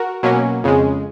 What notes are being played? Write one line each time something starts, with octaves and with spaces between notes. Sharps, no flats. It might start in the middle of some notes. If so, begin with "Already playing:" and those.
Already playing: F#4 A#4
B2 F#3 A#3 C#4
F2 C#3 G#3